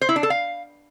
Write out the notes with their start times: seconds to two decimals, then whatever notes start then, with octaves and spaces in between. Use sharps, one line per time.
0.01 C5
0.09 E4
0.16 D4
0.23 A4
0.30 F5